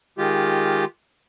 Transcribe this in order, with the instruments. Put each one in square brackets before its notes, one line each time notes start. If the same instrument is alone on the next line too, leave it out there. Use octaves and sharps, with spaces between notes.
[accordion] D#3 G#3 F4 G4